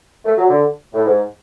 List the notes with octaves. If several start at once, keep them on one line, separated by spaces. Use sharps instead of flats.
A3
F#3
D3
A2
G#2